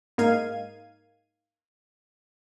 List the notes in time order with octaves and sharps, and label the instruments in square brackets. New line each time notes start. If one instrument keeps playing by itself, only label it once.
[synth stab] G#2 A#3 D#4 F5 G#6 D#7